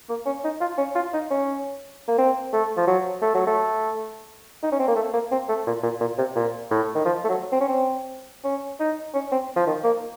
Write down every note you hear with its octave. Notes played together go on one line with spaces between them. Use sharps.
A#3
C#4
D#4
F4
C#4
F4
D#4
C#4
A#3
C4
A3
F3
F#3
A3
F#3
A3
D#4
C#4
C4
A#3
A3
A#3
C4
A3
A#2
A#2
A#2
C3
A#2
A2
D#3
F3
A3
F#3
C4
C#4
C4
C#4
D#4
C#4
C4
F3
D#3
A#3